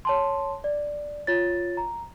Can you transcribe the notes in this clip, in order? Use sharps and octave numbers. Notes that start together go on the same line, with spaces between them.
C#5 A5 C6
D5
F4 C#5 A6
A#5